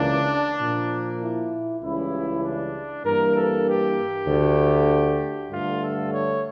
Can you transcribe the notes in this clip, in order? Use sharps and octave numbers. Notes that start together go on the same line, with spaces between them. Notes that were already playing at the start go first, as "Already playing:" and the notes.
Already playing: C#2 C#3 E3 A#3 D4
A#2 F3 A#3
E4
C#2 C#3 E3 G3 E4
D4
G2 E3 A#3 A#4
A4
G4
D2 D3 A3
G2 D3 A3 F4
A4
C#5